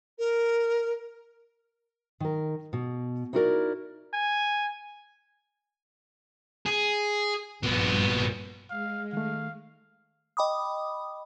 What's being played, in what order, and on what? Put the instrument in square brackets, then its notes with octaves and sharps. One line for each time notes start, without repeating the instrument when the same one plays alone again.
[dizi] A#4
[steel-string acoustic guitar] D#3 A#4
B2
D#4 E4 F#4 A4 A#4 D5
[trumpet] G#5
[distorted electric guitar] G#4
[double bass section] A#1 G2 [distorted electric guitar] A#2 B3
[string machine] G#3 [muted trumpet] F5
[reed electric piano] D#3 A3 [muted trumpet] F5
[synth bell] D#5 G5 B5 D6 D#6